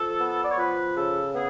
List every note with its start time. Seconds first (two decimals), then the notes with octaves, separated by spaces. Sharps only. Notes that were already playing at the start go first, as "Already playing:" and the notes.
Already playing: F3 A4
0.20 B3
0.43 D5
0.50 C#5
0.58 F3 B4
0.96 C#3 A4
1.34 B3 G#4